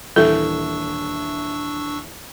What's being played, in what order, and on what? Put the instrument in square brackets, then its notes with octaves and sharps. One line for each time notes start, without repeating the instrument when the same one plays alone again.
[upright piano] D#1 E3 E5 [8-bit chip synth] D4 C#6 E6 [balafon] A4